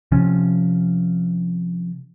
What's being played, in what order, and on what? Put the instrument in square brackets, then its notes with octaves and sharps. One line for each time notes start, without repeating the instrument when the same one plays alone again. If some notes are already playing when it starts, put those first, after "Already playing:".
[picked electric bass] C3 F3 C#4